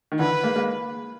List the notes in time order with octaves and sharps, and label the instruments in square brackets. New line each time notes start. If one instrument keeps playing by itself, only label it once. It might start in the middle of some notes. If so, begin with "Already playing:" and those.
[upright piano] D#3
[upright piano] D3 E3 [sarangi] B4
[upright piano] G#3 A#3
G#3 A#3